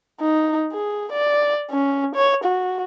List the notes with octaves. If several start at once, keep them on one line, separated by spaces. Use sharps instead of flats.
D#4
G#4
D5
C#4
C#5
F#4